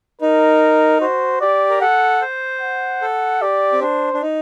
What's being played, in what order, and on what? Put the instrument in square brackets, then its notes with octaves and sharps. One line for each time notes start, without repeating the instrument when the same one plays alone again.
[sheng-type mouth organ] D#4 [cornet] A#4
[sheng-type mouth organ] F#4 [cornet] C5
[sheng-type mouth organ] G4 [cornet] D5
[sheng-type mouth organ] A#4
[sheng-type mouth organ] A4 [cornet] F#5
[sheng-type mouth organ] C5
[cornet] F#5
[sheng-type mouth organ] A4
[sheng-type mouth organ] G4 [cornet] D5
[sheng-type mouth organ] C4
[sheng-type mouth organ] D4 [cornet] C5
[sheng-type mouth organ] D4
D#4